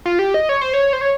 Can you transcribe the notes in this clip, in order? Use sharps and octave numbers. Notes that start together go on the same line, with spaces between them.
F4
G4
D#5
C#5
C5
C#5
C5
C#5